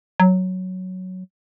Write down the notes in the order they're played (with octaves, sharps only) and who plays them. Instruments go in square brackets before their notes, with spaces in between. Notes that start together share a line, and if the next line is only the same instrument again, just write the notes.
[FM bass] F#3